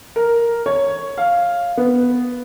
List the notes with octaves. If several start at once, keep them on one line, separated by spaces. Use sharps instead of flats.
A#4
C#5
F5
B3